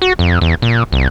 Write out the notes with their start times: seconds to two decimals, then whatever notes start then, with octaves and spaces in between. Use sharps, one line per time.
0.02 F#4
0.19 F2
0.41 E2
0.62 A#2
0.92 C2